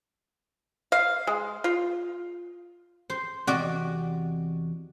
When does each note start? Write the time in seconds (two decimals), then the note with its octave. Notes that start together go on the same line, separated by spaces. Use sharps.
0.92 F5
1.27 G#3
1.64 F4
3.10 C5
3.47 E2 C3 F#4 D5 D#5